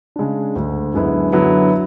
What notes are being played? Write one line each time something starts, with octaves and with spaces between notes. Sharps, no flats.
C#3 G#3 D4
D2 D3 G#3
F#2 D3 G#3 B3 E4
D3 F#3 B3 E4